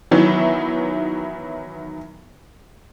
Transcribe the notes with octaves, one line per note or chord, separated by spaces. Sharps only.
D#3 E3 F#3 B3 E4